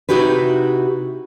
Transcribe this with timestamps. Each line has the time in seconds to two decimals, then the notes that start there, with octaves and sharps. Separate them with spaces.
0.09 C3 D#4 E4 F#4 G4 B4